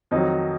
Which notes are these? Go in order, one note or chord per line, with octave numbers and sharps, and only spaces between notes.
F2 D#3 F#3 D#4